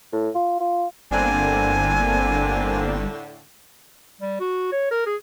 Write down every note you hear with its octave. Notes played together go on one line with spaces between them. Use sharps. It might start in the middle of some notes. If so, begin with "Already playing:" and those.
A2
F4
F4
G1 A2 D3 A#3 C4 D4 G#5
G3
F#4
C#5
A#4
G#4